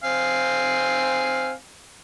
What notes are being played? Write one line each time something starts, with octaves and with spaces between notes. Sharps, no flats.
C4 F5 G#5